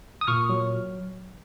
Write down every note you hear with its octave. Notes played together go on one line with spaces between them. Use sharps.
D#6
A#2 C#6 F6
F#3